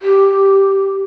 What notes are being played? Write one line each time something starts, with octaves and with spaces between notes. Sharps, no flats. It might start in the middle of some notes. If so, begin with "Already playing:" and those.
G4